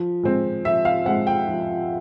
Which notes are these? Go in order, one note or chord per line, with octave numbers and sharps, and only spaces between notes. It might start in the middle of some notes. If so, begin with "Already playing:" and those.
Already playing: F3
G#3 C4
F3 E5
F5
G#3 C4 F#5
G5
F3